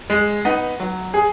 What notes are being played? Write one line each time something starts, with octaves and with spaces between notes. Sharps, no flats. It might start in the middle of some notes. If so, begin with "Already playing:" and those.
G#3
B3 D#4
F#3
G#4